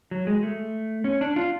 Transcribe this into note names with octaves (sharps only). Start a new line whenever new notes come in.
F#3
G#3
A3
C#4
D4
F4